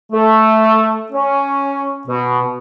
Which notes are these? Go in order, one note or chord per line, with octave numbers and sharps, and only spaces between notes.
A3
C#4
B2